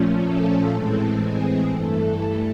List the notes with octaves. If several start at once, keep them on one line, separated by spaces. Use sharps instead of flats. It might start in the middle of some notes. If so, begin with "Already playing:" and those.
Already playing: A#2 F3 A3 C#4
A4
A2 E3 G#3 C4 A4
G#4
G2 E3 A3 A4